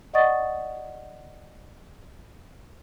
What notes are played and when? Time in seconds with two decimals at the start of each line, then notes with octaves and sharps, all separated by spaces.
0.13 D5 D#5 F#5 C#6 D#6 A6